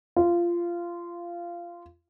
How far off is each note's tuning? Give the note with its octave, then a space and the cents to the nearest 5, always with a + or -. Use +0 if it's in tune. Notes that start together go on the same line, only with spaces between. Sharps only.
F4 -15